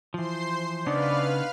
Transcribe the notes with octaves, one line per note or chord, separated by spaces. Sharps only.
E3 F3 C5 C6 C7
C#3 B3 D4 D#4 B4 D5 F5 F6